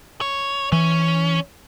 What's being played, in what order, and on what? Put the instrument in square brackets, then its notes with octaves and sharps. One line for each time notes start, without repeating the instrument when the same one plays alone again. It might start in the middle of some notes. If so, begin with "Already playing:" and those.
[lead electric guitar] C#5
[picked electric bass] E3 [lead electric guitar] C#4